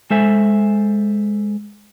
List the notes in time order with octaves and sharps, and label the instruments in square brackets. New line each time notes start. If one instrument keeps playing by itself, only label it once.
[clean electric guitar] G#3 A4 C5 E5 G#5